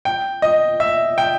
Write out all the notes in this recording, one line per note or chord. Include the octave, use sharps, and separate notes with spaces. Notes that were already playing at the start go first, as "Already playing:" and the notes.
G5
D#5
E5
G5